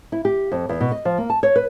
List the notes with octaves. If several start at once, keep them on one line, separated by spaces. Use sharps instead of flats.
E4
G4
F2
E2
B2
D#5
F3
A#3
A5
C#5
B4